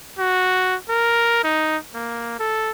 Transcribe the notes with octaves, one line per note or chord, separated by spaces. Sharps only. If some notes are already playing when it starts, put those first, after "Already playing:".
F#4
A#4
D#4
A#3
A4